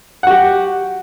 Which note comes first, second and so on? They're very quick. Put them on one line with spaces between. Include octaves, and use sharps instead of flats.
F#5 F#4 G4